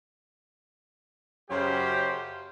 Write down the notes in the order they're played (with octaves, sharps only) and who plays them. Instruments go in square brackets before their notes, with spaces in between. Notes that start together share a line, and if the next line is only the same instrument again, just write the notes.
[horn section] F#2 C#3 F#3 G4 C5